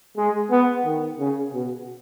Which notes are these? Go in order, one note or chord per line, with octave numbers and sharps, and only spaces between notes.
G#3
B3
D#3
C#3
B2